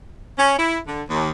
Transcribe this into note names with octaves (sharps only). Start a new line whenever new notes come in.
C#4
E4
D3
D#2